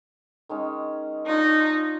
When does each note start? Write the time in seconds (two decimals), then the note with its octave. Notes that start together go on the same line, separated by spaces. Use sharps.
0.49 D#3 G#3 C#4
1.27 D4 D#4 F4 C#5
1.60 F4